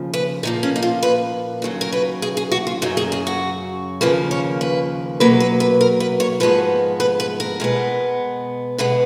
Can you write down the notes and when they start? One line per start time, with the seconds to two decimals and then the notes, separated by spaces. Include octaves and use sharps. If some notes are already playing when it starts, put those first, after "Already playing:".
Already playing: D#2 C#3 F3
0.14 B4
0.43 A#2 F3 A#3 D#4
0.63 C#4
0.76 D#4
0.82 F4
1.03 B4
1.62 D#2 C#3 F#3
1.81 A#4
1.92 B4
2.22 G#4
2.37 G#4
2.52 F#4
2.67 F4
2.82 F#2 C#3 F#3 D#4
2.97 G#4
3.12 G#4
3.27 F#4
4.01 D#2 C#3 F3 A#3 B4
4.31 C#5
4.61 B4
5.20 B2 F#3 A#3 B4
5.40 B4
5.60 B4
5.81 A#4
6.00 B4
6.20 C#5
6.40 G#2 F3 G#3 B3 B4
7.00 B4
7.20 B4
7.40 A#4
7.60 B2 G#3 B3
8.78 B2 G#3 B3 B4